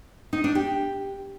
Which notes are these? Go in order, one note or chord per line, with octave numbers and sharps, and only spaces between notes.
D#4
D4
G4